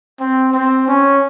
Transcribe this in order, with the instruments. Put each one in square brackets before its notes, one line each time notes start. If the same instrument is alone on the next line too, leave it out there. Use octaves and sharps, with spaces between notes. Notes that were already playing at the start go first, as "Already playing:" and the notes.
[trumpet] C4
C4
C#4